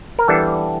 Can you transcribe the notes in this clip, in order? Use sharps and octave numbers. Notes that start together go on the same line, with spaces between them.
A#4
E3 G3 B3 D4 A4